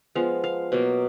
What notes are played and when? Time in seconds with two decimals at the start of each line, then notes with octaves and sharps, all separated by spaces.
0.15 F3 G#3 B3 F5
0.44 F5
0.72 B2 F#3 A#3